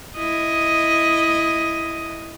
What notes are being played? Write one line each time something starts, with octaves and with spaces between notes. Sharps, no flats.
E4 D#5